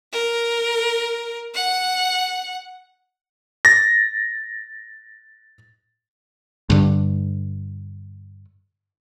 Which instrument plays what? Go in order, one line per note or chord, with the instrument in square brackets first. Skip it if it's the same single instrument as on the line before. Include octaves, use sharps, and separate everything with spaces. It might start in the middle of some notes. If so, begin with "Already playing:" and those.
[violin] A#4
F#5
[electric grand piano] A6 A#6
[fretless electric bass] G2 D3